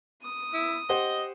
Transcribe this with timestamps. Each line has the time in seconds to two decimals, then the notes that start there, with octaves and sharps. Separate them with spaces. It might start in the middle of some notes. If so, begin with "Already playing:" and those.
0.23 D#6
0.54 E4
0.89 G4 C5 D#5 F#5